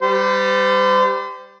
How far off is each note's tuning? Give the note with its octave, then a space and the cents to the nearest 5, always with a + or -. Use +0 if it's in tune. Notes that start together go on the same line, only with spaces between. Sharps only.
G3 +0 C5 -40